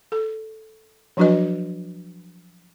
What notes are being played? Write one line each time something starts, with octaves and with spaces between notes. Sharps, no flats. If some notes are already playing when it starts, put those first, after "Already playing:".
A4
F3 F#3 D4 F#4 B4 D#5